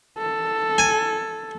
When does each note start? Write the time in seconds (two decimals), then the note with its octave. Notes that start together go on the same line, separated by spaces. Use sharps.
0.18 A4
0.78 G#5